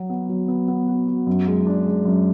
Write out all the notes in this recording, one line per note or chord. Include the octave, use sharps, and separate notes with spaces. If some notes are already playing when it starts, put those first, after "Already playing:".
Already playing: F#3 F#4
B3
F#3
B3
B3
F#4
F#4
F#2
G#3
D4
G#3
F#2